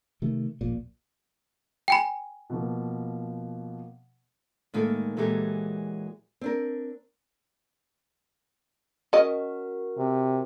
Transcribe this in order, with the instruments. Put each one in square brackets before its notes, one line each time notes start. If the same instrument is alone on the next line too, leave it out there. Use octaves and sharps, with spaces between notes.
[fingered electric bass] C3 D#3 A3
D#1 A#1 A#2
[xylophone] G5 G#5 B5
[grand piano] B2 F3 A#3
[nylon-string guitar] A2 D#3 G#3 A#3 A4
A#2 E3 F#3 G#3 G4 A4
C4 D4 A#4
[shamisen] C#4 D#5 [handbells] F#4 A#4
[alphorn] C3